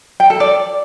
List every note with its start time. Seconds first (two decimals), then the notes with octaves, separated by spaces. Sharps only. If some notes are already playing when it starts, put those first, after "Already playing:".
0.20 G5
0.30 A4
0.40 D5